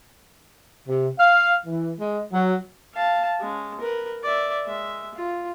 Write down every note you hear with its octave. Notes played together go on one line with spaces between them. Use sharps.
C3
F5
E3
G#3
F#3
F5 A5
G#3 C#4
A#4 B4
D5 E5
G#3 E5
F4